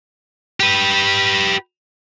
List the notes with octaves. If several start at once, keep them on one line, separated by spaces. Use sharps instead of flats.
G4 B4